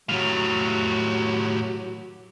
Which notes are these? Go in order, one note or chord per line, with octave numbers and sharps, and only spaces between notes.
A2 D#3 F#3 G4 F5